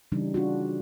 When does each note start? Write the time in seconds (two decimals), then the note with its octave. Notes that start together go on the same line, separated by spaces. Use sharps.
0.12 C#3 E3 G3 D4 D#4
0.34 D4 F4 F#4